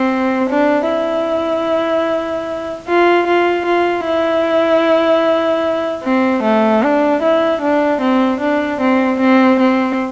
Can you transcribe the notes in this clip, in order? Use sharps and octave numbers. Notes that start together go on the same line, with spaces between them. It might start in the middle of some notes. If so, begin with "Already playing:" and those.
Already playing: C4
D4
E4
F4
F4
F4
E4
C4
A3
D4
E4
D4
C4
D4
C4
C4
C4